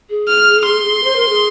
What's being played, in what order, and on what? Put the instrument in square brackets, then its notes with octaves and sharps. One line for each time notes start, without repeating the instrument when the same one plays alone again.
[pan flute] G#4
[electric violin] F6
C6
[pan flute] C5
A#4
G#4